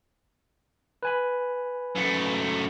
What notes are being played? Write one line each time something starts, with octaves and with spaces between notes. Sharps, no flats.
B4 G#5 B5
F#2 A3